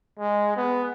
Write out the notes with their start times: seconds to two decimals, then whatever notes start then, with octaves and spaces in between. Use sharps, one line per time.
0.19 G#3
0.56 B3